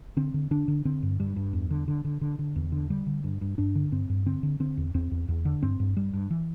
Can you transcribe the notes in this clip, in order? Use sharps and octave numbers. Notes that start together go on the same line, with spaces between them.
D3 C4
D3
D3 D4
D3
D3 C4
G2
G2 G3
G2
E2
D3
D3
D3
D3
D3
E2
D3
D3 G3
D3
G2
G2
G2 D4
D3
G2 C4
G2
D3 C4
D3
D3 C4
E2
E2 C4
E2
E2
D3
G2 C4
G2
G2 G3
G2
E3